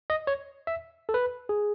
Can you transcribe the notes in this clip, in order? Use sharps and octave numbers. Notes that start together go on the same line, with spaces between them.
D#5
C#5
E5
A4
B4
G#4